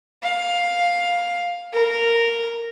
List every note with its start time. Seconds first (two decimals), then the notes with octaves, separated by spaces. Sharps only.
0.23 F5
1.74 A#4